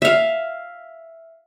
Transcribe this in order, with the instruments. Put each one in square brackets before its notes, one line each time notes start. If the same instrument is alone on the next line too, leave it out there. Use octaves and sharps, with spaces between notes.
[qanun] E5 F5